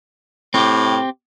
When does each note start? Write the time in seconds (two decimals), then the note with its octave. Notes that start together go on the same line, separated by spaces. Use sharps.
0.54 A2 C4 G4